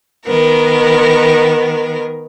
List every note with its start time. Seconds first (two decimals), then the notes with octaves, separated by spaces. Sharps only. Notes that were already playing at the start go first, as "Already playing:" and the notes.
0.25 D#3 B3 A#4